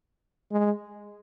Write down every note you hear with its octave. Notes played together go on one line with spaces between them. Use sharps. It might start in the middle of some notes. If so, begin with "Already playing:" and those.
G#3